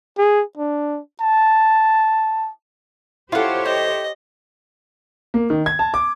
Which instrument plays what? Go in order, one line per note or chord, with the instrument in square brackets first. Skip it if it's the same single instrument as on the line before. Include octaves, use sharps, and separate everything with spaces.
[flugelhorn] G#4
D4
A5
[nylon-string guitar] E4 A4 [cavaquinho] F4 F#5 [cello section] G4 C5 C#5
[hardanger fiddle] D#5 [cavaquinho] G5
[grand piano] A#3
D#3
G#6
A5
D6